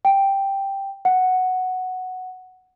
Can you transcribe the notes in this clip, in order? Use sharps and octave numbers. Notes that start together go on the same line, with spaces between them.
G5
F#5